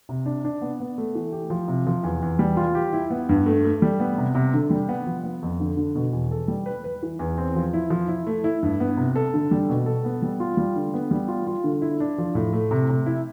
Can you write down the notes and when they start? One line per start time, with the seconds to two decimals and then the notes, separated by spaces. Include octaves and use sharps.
0.09 C3
0.26 D4
0.45 D4
0.62 B3
0.80 B3
0.98 A3
1.15 E3
1.32 G4
1.50 F3
1.68 C3
1.87 F3
2.03 E2
2.22 E2
2.39 G3
2.57 F4
2.75 G4
2.93 E4
3.10 B3
3.29 G2
3.46 A3
3.64 A3
3.82 G3
4.00 B3
4.18 C3
4.35 C3
4.54 D3
4.70 G3
4.89 B3
5.06 F3
5.24 B3
5.42 F2
5.60 D3
5.77 D3
5.95 B2
6.12 E2
6.31 A4
6.48 G3
6.66 B4
6.84 B4
7.03 E3
7.19 E2
7.38 C4
7.56 F3
7.74 E4
7.90 F3
8.08 E4
8.27 A3
8.44 E4
8.63 G2
8.80 B3
8.97 C3
9.16 A4
9.34 D3
9.51 G3
9.69 B2
9.86 A4
10.05 B3
10.22 G3
10.40 F4
10.57 G3
10.76 D3
10.94 B3
11.11 G3
11.28 F4
11.47 F4
11.64 D3
11.82 E4
12.00 D4
12.18 F3
12.35 A2
12.53 A3
12.71 C3
12.89 C3
13.06 E4